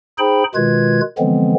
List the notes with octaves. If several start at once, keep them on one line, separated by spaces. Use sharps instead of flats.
D#4 G#4 C5 G5 B5
B2 D#3 G#3 F4 B4 G#6
D3 E3 F3 G#3 B3 C4